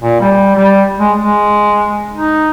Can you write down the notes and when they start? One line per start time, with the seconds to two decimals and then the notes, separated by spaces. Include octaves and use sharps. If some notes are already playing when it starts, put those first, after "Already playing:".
0.02 A#2
0.21 G3
0.55 G3
0.99 G#3
1.19 G#3
2.14 D#4